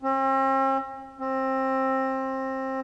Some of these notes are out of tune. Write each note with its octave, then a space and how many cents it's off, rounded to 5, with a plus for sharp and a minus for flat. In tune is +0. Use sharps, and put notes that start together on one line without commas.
C4 +45
C4 +20